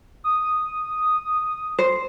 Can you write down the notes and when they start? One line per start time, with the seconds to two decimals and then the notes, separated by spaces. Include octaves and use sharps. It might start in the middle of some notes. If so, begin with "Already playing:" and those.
0.24 D#6
1.79 C5